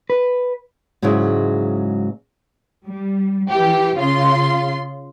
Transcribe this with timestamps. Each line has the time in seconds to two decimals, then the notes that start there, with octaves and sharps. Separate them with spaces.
0.10 B4
1.02 G#2 C#3 F#3 G#3 E4
2.85 G3
3.50 E3 G4
3.97 C#3 F4 C6